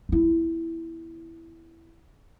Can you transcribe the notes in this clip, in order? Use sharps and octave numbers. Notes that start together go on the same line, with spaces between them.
B3 E4